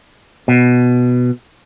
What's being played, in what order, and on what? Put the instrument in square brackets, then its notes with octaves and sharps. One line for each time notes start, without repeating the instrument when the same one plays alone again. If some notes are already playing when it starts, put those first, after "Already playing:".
[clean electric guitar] B2